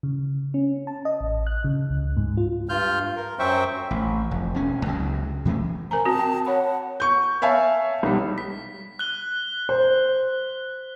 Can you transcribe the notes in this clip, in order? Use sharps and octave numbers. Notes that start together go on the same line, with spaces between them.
C#3
C#4
A5
D#5
A1
F#6
C#3
C#2
G#2
F4
G2 F4 F6 G6
A#4
F#2 F#3 C5 E5 G5 C#6
A1
F1
E1 C#4
C#2 C#3 E3 F#3
C3 E3 A3 C#4
A#4 C5 G#5 A#5
C4 F#4 A5
C4 G5
C#5 F#5 B5
C#6 G6
C#5 E5 F5 G#5 A5
B1 G3
B6
F#6 G7
C5